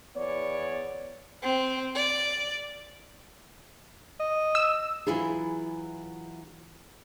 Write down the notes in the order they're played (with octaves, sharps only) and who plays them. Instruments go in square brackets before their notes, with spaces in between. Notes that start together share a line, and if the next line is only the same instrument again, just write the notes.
[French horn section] E2 B3 C#5 D5
[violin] C4
D5
[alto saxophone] D#5
[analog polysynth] E6
[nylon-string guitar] E3 F#3 E4 F4 G#4